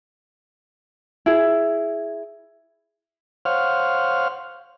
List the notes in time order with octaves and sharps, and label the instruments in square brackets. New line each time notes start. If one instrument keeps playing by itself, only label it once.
[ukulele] E4 G#4
[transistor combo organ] C5 C#5 F5 F#5 F6